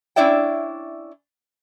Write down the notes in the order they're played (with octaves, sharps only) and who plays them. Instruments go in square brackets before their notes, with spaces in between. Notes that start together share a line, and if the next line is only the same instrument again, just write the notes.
[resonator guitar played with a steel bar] C#4 D4 E4 D5 E5 G5